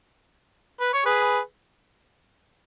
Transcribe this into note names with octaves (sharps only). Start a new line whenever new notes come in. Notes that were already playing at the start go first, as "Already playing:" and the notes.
B4
C#5
G#4 B4